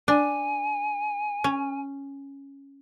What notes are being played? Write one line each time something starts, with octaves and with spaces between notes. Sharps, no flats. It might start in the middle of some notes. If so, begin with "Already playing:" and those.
D4 G#5
C#4